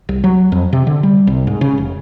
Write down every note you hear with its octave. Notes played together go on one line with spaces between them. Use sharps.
C2
F#3
F2
C3
D3
G3
C2
G#2
C#3
F1